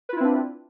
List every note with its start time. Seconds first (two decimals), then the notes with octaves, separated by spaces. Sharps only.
0.09 B4
0.13 F4
0.17 E4
0.20 C4
0.24 D4